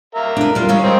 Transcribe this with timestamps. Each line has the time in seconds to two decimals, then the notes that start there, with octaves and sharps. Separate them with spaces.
0.15 A#4 E5 F5
0.37 D4 B4
0.55 E2 G3 F4 A#4
0.69 G3 G#3 C#4 F5
0.83 D#3 C4